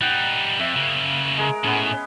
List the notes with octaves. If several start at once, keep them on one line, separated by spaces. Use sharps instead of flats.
G3 D#4 F#5 G5
F2 E5
C#3 A#3
G#3 G#4 A#4
A2 B3 C#4